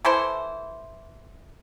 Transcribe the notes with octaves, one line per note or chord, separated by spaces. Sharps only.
E3 E4 A4 C5